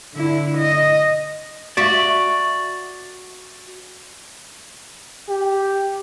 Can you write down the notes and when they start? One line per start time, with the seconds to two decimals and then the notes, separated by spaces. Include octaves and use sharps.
0.15 D3 E4
0.58 D#5
1.77 F#4 D5 E5
5.29 G4